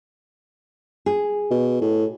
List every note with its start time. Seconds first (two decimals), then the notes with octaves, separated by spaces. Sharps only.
1.06 G#4
1.51 B2
1.81 A2